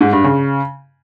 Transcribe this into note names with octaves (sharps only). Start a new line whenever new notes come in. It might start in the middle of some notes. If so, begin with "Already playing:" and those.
G#2
G2
C#3